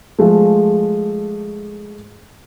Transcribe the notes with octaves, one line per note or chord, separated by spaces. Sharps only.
F3 G#3 A3